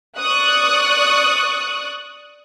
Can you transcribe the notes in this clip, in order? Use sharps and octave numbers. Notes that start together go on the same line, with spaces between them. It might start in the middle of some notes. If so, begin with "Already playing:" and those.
D5 C#6 D#6 F#6